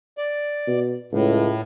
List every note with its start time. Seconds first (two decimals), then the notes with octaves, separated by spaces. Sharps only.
0.18 D5
0.67 B2
1.13 C#2 A2